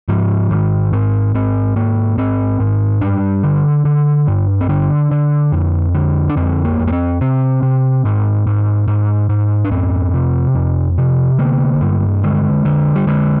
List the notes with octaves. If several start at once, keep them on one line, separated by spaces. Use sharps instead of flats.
G#2 F3
G#2 D#3
G#2 C4
G#2 C4
G#2 A#3
G#2 C4
G#2
G2 D4
D3
D3
G2
C4
D3 D4
D3
F2
D3
D4
F2 C4
A#3
F2
A#3
C4
C3 C4
C3
G#2
G#2
G#2
G#2
D4
F2 C4
C3
F2
C3
D3 A#3
G2
D3 G#3
D3
G3
D3 G#3